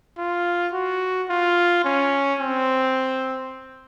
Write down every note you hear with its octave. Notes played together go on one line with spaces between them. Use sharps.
F4
F#4
F4
C#4
C4